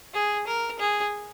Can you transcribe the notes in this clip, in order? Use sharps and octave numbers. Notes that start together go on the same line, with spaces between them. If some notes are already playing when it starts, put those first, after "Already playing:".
G#4
A#4
G#4